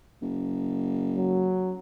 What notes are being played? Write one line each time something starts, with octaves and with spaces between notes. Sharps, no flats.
F#1
F#3